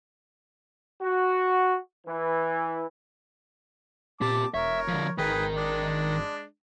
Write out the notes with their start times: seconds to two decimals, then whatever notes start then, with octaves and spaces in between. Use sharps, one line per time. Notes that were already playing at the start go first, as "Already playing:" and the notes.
1.01 F#4
2.06 E3
4.21 A#2 C4 G4 A5 D6
4.54 E1 A#4 C#5 E5
4.88 D3 F3
5.18 G#1 D#3 G#4 A#4 B4 G5
5.56 G#3 D4